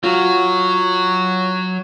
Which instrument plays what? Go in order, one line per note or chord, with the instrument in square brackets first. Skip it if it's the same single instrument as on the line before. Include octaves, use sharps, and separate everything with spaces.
[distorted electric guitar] F#3 [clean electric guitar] F4 F#4